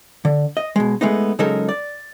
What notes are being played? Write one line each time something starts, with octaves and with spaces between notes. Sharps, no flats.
D3
D#5
B2 G#3
G#3 A3 B3 D#4
C#3 F#3 G#3 D#4 A4 A#4
D5